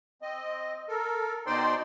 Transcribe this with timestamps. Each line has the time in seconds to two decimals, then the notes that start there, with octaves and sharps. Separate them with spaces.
0.22 C4 D#5
0.88 A4 A#4
1.47 B2 D#4 C5 D5 G5 C6